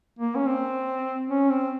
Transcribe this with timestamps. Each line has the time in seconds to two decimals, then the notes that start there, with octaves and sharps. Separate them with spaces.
0.19 A#3
0.36 C#4
0.46 C4
1.30 C#4
1.50 C4